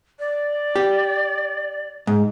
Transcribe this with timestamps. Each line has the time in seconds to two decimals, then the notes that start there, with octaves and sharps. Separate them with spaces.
0.19 D5
0.76 G4
2.07 G#2